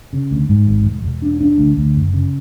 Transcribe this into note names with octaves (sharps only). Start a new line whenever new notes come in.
C#3
D2
G#2
G#1
E1
E1
D4
D4
D2
D2
F#1
C#3